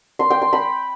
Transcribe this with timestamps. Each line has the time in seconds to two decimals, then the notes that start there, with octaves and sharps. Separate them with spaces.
0.19 C6
0.30 G5
0.42 C6
0.53 B5